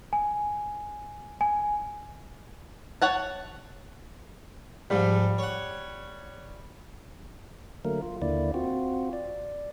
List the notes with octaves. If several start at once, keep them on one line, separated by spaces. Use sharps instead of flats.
G#5
G#5
C#5 F#5 A5
G#2 F3 G3
C#5 F#5
D3 F#3 A3 A#3 A#4
F4
D#2 D3 A#3 E4 D5
C4 F4 F#4
D5